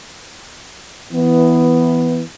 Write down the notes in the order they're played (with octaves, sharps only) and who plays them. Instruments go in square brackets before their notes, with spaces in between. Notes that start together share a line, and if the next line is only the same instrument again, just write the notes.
[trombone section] E3 B3